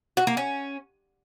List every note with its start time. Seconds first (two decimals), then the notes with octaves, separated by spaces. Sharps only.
0.17 F#4
0.27 A#3
0.37 C#4